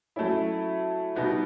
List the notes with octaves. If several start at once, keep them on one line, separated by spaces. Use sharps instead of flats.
F#3 A3 C#4 E4
B2 G3 B3 D#4 F#4